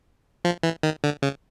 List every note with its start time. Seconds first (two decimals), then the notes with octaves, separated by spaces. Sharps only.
0.45 F3
0.63 E3
0.83 D#3
1.04 D3
1.22 C#3